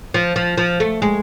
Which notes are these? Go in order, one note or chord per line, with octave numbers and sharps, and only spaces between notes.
F3
F3
F3
A3
G#3